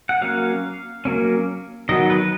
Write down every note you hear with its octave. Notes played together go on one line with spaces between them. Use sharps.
F#5
F#3 A#3 C#4 F5
F#3 A#3 C#4
D#3 F#3 B3 D#5
B4